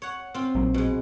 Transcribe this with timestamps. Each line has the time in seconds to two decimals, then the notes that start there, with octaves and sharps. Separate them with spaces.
0.02 C#5 F#5
0.34 C4 F4
0.55 A#1 F#3
0.74 B2 G#3